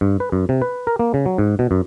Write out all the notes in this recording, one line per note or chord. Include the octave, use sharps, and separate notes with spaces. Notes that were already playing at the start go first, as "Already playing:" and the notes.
G2
B4
F#2
C3
B4
A#4
A#3
C#3
F#3
G#2
B2
F#2